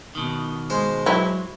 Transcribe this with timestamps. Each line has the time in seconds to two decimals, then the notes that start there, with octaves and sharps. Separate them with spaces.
0.15 B2 D#3
0.70 G#3 C5
1.06 E3 F#3 E4